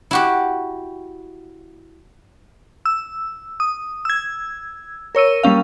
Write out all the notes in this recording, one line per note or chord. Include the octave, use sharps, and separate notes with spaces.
E4 F#4 G4
E6
D#6
E6 G#6
A#4 C#5 E6 D#7
G3 A#3 C#4 F5